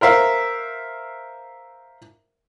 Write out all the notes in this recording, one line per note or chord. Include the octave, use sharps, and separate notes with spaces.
A#4 C5 E5 F5